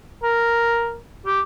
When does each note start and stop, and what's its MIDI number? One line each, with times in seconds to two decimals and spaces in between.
0.23 0.96 70
1.26 1.40 67